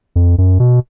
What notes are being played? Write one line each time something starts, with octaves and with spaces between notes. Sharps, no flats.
F2
F#2
B2